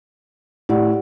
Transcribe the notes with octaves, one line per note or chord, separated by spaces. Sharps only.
A2 G4 D5 F#5